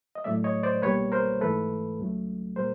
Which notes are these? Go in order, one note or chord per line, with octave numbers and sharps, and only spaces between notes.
D#5
A2 F#3 A3 D5 E5
C#5 D#5
C5 D5
C2 B2 G3 A#3 B4 C#5
A#4 C5
G#2 E3 A3 A4 B4
C#2 C#3 F#3 A3
A#2 G3 A#3 A#4 C5